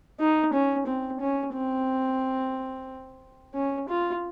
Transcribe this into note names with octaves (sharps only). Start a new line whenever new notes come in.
D#4
C#4
C4
C#4
C4
C#4
F4